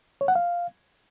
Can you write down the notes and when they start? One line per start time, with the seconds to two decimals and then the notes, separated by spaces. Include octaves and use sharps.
0.21 C#5
0.28 F#5
0.35 F5